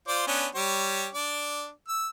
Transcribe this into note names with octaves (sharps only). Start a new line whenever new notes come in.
F4 C5 D5
B3 C#4 D4
G3 G4 C#5
D4 D5
E6